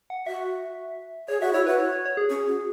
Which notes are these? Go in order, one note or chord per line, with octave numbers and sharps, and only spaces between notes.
F#5
F#4 E5
G#4 C#5
F#4 E5
E4 C#5
F#4 B4
C#5
C#5
C#5
G#4
C#4
F#4